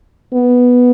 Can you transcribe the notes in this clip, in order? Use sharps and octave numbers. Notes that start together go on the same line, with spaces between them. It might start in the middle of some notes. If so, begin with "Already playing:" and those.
B3